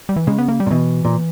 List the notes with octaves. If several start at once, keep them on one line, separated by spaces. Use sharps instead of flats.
G3
E3
C#3 G#3
B3
A#3
G3
A#2
B2 E3
A#2